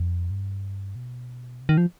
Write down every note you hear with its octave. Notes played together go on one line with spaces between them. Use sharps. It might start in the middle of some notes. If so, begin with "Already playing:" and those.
Already playing: F2
G2
B2
C3
D#3
F3